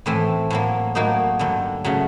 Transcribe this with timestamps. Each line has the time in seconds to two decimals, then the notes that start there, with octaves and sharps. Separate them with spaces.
0.06 A2 E3 A3 C4
0.50 A2 F#3 A#3
0.95 A2 F#3 A#3 D#4 F#4
1.39 G2 D3 F#3
1.84 C#3 F#3 A3